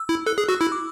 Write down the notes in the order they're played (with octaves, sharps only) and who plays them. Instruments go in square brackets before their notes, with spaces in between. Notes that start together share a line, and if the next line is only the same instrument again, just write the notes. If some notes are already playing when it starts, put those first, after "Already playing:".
Already playing: [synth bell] E6
[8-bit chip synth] E4
[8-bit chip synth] A4 [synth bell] F#6
[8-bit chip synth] G#4
[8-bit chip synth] F#4 [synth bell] E6
[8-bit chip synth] E4 [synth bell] E6
[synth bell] D6